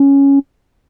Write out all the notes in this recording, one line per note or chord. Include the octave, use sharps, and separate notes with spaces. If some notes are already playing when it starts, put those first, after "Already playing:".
Already playing: C#4